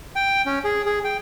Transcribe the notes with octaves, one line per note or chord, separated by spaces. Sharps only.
G5
C#4
G#4
G#4
G5